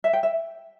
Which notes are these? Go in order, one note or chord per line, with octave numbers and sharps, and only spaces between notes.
E5
G5
E5